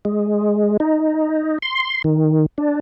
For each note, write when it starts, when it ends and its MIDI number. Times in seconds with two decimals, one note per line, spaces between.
0.05 0.77 56
0.80 1.58 63
1.62 2.02 84
2.04 2.46 51
2.58 2.80 62